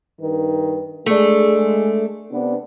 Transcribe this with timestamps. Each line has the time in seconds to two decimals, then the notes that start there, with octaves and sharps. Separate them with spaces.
0.21 G2 D#3 B4
1.06 G#3 A3 D4 G#4
2.31 C3 B3 D4